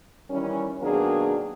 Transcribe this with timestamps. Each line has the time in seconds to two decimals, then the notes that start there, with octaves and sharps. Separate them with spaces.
0.31 D#3 E3 G3 C#4
0.82 B2 D#3 F#3 A#3 D4 G#4